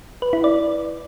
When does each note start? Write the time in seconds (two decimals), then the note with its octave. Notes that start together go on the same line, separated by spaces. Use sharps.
0.22 B4
0.33 E4
0.44 D5